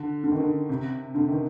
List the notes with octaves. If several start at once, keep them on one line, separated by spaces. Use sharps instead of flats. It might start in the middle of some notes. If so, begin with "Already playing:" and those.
Already playing: D3
D3
D#3
D3
C3
D3
D#3